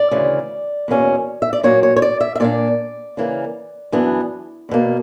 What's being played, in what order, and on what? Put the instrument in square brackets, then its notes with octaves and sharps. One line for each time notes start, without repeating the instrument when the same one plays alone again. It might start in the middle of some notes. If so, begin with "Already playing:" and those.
Already playing: [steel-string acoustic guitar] D5
D2 C#3 E3
E2 B2 A#3 C#4
E5
D5
A#2 F#3 A#3 C#5
C#5
C#5
D5
E5
E5
A#2 A#3 D4 D5
C#3 E3 A#3
F#2 E3 B3 D4
E2 B2 A#3